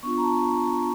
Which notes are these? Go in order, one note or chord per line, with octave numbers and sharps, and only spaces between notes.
B3 D4 F4 C#6
A#5
A5